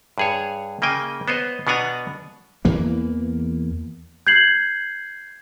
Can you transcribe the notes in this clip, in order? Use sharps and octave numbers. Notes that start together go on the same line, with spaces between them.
G2 G#4 C#5
C#3 A#3 D#5 G5 G#5
B3 C5 C#5 D#5
B2 B3 D4 F#5 G#5 A#5
E2 E3 A#3
G6 G#6 C7 F#7